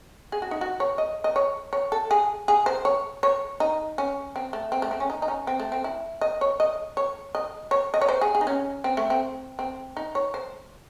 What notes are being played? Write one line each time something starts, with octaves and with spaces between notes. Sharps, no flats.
G#4
F#4
D#4
F#4
C#5
D#5
D#5
C#5
C#5
A4
G#4
G#4
C5
C#5
C#5
D#4
C#4
C4
A3
C4
A3
C4
C#4
D#4
D#4
C#4
C4
A3
C4
E4
D#5
C#5
D#5
C#5
D#5
C#5
D#5
C#5
C5
G#4
G#4
D#4
C#4
C4
A3
C4
C4
D#4
C#5
C5